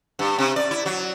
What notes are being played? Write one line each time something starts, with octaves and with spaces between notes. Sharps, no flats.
G2
C3
D5
E4
F#3